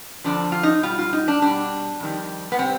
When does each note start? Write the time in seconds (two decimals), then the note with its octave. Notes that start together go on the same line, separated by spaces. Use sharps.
0.24 F2 D3 F3 D4
0.52 F4
0.63 D#4
0.83 B2 G3 F4
0.99 F4
1.13 D#4
1.28 D4
1.42 B2 G3 D4
2.00 F2 D#3 G3
2.52 B3
2.59 C3 G3 C4